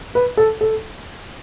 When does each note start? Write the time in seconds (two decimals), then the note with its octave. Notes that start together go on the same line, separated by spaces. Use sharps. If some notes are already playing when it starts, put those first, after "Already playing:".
0.15 B4
0.37 A4
0.61 A4